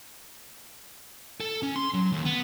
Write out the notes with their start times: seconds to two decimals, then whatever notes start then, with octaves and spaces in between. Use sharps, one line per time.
1.40 A4
1.63 C#4
1.76 C6
1.94 F#3
2.12 D#2
2.25 B3